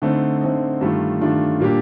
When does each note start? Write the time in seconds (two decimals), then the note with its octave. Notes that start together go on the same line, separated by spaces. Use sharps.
0.02 D3 A3 C4 D#4
0.41 D3 A3 C4 D#4
0.81 G2 D#3 A3 D4 F4
1.20 G2 D#3 A3 D4 F4
1.60 A#2 G3 A#3 D4 G4